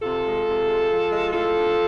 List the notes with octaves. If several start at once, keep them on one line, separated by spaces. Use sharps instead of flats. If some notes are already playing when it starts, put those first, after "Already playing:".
C3 F4 A4
G#3
C3
G#3
F3
G#3
A2 F4 A4
D4